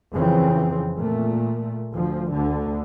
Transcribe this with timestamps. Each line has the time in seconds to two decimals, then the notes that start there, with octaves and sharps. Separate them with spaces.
0.13 F2 C#3 E3 C4
0.96 A#2 A3
1.91 D2 F3
2.32 D2 D3